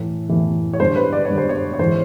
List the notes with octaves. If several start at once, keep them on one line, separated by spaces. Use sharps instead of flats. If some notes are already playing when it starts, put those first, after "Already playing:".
Already playing: A2 E3
A2 E3
C#5
G2 D3 C5
B4
D5
G2 D3 C#5
C5
C#5
C#5
G#2 E3 C5